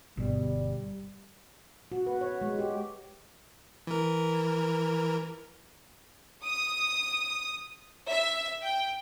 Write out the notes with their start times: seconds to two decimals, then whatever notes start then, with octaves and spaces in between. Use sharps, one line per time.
0.17 G1 B2 G3
1.92 F#4
2.07 B4
2.21 C#5
2.42 G#3
2.59 G4
3.87 E3 A#4
6.43 D#6
8.10 E5
8.62 G5